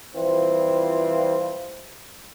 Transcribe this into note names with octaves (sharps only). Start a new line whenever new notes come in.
E3 F3 G3 C4 F4